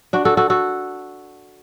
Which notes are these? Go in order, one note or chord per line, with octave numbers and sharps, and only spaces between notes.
D4 F#4
F#4 A4
F#4 A4
F#4 A4